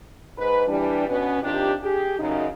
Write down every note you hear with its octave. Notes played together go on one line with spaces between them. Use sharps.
G#2 B4
E3 G3 D4
B2 B3 C#4
C3 D#3 D4 F4 G4
G4 G#4
F#2 C#3 D#4